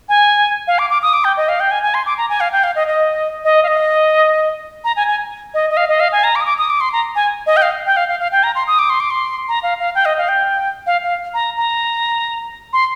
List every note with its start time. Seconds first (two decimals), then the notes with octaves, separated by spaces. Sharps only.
0.09 G#5
0.67 F5
0.79 D6
0.90 D6
1.02 D#6
1.13 D6
1.24 G5
1.37 D#5
1.49 F5
1.60 G5
1.71 G#5
1.83 G#5
1.94 C6
2.06 D6
2.18 A#5
2.30 G#5
2.40 F5
2.52 G5
2.64 F5
2.75 D#5
2.87 D#5
3.45 D#5
3.63 F5
3.68 D#5
4.84 A#5
4.96 G#5
5.08 G#5
5.54 D#5
5.70 D#5
5.77 F5
5.89 D#5
6.00 F5
6.12 G#5
6.24 A#5
6.36 D6
6.41 D#6
6.46 D6
6.58 D#6
6.70 D6
6.81 C6
6.93 A#5
7.15 G#5
7.46 D#5
7.57 G5
7.62 F5
7.86 G5
7.97 F5
8.08 F5
8.20 F5
8.32 G5
8.43 A#5
8.55 C6
8.67 D#6
8.79 D6
8.90 C6
9.00 D6
9.10 C6
9.48 A#5
9.63 F5
9.79 F5
9.95 G5
10.05 D#5
10.18 F5
10.28 G5
10.87 F5
11.03 F5
11.34 A#5
11.57 A#5
12.73 C6